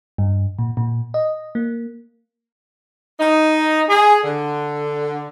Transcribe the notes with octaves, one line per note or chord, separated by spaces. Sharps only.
G2
A#2
A#2
D#5
A#3
D#4
G#4
D3